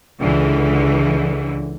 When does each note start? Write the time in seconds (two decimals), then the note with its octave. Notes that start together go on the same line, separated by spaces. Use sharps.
0.19 C#2 D3 E3